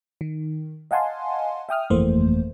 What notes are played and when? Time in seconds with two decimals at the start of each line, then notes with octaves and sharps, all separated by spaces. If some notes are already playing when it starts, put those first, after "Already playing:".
0.21 D#3
0.91 D#5 F5 F#5 G#5 A5 C6
1.69 E5 G5 D#6 F6
1.90 G1 F2 E3 A3 A#3 C5